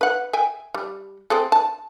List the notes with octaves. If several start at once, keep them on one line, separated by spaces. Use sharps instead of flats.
B4 F#5
E5 G5 G#5
G3
C4 G#4 A4
A5